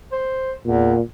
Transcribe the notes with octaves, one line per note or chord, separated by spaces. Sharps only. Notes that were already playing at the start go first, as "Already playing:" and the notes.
C5
E2 A#2